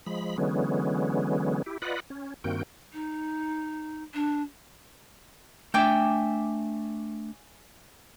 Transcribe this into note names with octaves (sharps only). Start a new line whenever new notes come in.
F3 G#3 B5
D3 E3 F#3 G#3 B3 C#4
E4 G4
F4 B4 D5 D#5 F#5 B5
C#4
G2 D#3 A#3 C4 F#4 G5
D#4
D4
A3 D4 E5 G5 G#5 D6